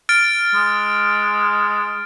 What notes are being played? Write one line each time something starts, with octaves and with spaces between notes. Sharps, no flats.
F6 A6 D7
G#3